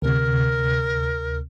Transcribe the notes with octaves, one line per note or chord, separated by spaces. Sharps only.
D2 C3 A#4